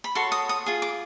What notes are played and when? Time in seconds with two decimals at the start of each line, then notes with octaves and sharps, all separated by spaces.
0.04 B5
0.15 F#4 A4 C#5 C6
0.32 D#6
0.49 D#6
0.66 F4 G#4
0.82 D6